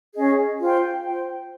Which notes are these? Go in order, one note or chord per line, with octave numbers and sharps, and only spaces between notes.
C#4 G#4 D#5
F4 C5 G5
F4 C5 G5